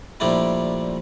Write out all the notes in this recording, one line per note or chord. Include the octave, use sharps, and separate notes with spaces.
A#2 F3 G3 A3 D4 E4